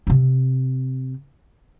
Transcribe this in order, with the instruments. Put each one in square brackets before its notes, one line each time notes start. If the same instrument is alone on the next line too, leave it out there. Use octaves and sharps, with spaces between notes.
[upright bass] C3 C4